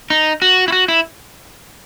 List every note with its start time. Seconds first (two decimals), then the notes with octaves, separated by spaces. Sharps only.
0.10 D#4
0.42 F#4
0.68 E4
0.72 F#4
0.88 E4